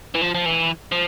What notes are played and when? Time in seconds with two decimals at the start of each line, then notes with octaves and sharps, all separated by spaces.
0.15 E3
0.21 F3
0.35 F3
0.46 E3
0.92 F3